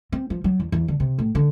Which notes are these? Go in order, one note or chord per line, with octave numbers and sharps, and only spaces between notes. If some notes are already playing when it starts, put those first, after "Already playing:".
C4
F3
F#3
E2
E2
D3
C3
A2
D3